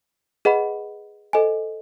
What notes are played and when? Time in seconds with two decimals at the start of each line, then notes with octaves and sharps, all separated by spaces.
0.45 G#4 B4 D#5 F#5 B5
1.33 A4 C5 D#5 G#5